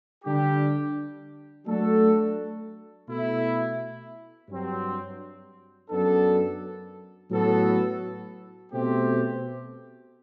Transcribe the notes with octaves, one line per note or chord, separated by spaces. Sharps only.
D3 G3 D4 G4
F#3 A3 D4 F#4 A4
B2 A3 E4
G2 F#3 C4
F#2 F#3 B3 D4 A4
A2 F#3 B3 F#4 A4
B2 A3 C4 G4